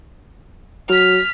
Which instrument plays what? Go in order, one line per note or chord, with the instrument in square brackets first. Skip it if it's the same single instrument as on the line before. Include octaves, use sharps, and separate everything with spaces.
[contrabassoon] F#3 [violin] F6 B6